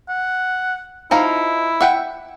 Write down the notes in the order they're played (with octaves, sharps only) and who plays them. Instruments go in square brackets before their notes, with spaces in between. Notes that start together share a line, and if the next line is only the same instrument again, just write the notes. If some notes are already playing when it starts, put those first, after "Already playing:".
[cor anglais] F#5
[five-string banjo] F3 D#4 F5 [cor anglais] E4
[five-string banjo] E5 F#5 G5